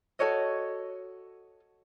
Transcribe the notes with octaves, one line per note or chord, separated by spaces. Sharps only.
F#4 A4 C#5 D#5